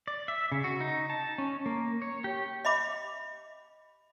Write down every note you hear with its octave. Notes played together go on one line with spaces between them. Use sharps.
D5
E5
C#3
F#4
D#4
A5
C#4
A#3
C#5
G4
D#5 E5 B5 D6